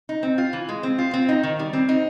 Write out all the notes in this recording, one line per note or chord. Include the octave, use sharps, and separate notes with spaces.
D#4
C4
F4
E3
G#3
C4
F4
C4
D#4
D#3
G3
C4
D#4